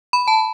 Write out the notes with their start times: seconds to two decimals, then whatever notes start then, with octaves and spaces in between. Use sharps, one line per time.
0.13 B5
0.28 A5